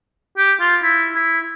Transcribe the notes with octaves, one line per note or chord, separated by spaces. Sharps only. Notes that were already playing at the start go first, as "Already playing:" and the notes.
G4
F4
E4
E4